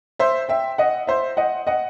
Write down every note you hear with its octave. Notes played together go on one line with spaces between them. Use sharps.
C5 E5
E5 G5
D#5 F#5
C5 E5
D#5 F#5
D#5 F#5